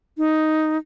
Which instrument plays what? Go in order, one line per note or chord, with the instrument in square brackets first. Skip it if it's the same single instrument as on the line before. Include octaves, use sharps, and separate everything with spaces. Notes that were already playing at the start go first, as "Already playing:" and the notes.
[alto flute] D#4